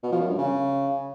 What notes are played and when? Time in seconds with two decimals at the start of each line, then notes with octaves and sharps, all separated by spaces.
0.03 B2
0.12 F3
0.21 F#2
0.29 G2
0.38 C#3